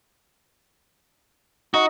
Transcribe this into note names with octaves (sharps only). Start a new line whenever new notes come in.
D#4 F#4